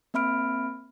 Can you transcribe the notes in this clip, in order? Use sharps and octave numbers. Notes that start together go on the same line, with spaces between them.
A#3 C4 E5 B5 F6 D7